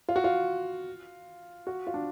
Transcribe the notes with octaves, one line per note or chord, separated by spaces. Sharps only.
F4
F#4
F4
F#4
F4
D4